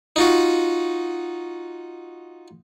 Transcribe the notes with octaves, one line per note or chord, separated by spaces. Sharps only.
D#4 F4 F#4